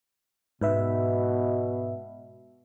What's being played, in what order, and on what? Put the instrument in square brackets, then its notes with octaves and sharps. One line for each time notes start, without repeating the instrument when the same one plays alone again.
[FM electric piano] G#2 B4 E5 [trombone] B2